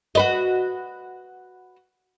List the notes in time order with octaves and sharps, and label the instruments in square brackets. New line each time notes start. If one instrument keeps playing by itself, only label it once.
[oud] F#4 B4 D#5